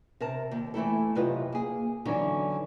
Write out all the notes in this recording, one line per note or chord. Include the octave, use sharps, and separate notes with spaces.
C3 A#4 A5
D#2
E3 A3 E4 A4
F#2 C3 F4 B4 D#5
A#3 G#4
D3 E3 F#3 C#4 D#4 E4